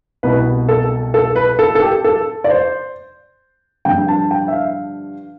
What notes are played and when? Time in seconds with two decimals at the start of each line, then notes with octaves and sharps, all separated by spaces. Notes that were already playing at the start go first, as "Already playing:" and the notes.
0.23 C2 B2 B4
0.69 A4
1.14 A4
1.36 B4
1.59 A4
1.75 A4
1.82 G4
2.04 A4
2.44 D5
2.50 C5
3.85 G2 D3 F3 G5
4.08 A5
4.31 G5
4.48 E5
4.53 F5